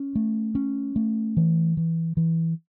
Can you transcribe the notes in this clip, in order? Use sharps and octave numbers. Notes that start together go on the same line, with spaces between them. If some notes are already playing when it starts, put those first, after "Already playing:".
Already playing: C#4
A3
C#4
A3
E3
E3
E3